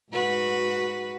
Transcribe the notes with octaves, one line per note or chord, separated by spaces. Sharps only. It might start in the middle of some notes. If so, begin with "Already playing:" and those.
G#2 F#4 B4